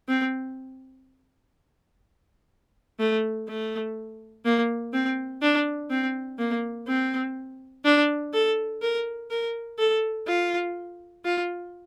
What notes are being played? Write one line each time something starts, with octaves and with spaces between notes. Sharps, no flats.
C4
A3
A3
A#3
C4
D4
C4
A#3
C4
D4
A4
A#4
A#4
A4
F4
F4